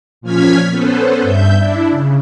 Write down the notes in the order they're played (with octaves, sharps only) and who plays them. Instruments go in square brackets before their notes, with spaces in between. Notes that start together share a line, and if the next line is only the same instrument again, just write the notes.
[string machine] A#2 F3 C#4 F6 G#6 B6
B3 C#4 A4 B4 C5
G2 E5 G6
D4 E4
C#3